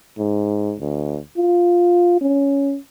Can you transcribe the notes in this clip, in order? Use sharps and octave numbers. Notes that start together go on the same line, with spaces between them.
G#2
D2
F4
C#4